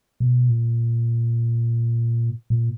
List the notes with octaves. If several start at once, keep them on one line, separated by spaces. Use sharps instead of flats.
B2
A#2
A#2